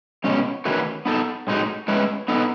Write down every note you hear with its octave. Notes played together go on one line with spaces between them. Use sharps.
B2 G#3 C#4
D#3 A3 C#4 F#4 B4
B3 D#4 A4
A2 G#3 D#4 F#4
A2 G#3 C#4 E4 B4
B3 D#4 A4